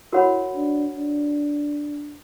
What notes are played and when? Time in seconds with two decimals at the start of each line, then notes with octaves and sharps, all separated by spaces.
0.12 E4 F#4 A#4 C#5 F#5 B5
0.54 D4
0.95 D4